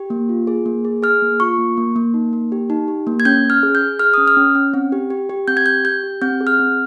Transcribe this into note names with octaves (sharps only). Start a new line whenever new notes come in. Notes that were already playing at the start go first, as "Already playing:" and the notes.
Already playing: G4
A#3
F4
G#4
A#3
G#4
G#4 F6
A#3
F4 C#6
A#3
A#3
A#3
D#4
A#3
G4
D#4
G4
A#3
G#6
C#4 G6
C#4
F6
G#4
G6
G#4
G#4 F6
C#4 D#6
F6
C#4
C#4
C4
G4
G4
G4
C4 G6
G#6
G4 G6
G4 G6
G4
C4 G6
G#4
F6
C4